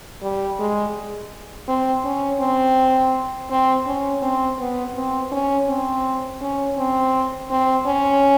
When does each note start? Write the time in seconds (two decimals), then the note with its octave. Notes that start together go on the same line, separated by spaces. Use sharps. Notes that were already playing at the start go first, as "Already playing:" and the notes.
0.23 G3
0.59 G#3
1.68 C4
2.04 C#4
2.41 C4
3.50 C4
3.86 C#4
4.23 C4
4.59 B3
4.96 C4
5.32 C#4
5.68 C4
6.41 C#4
6.78 C4
7.51 C4
7.87 C#4